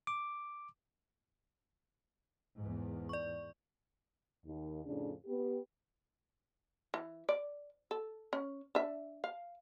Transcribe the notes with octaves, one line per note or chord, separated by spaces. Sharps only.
D6
E2 G#2
D5 C#6
D#2
F2 A2 C#3 D4
B3 G4
E3
D5
A4
C#4
D4 E5
F5